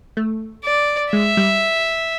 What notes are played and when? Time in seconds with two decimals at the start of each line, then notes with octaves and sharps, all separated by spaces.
0.17 A3
0.65 D5
1.13 G#3 E5
1.37 G3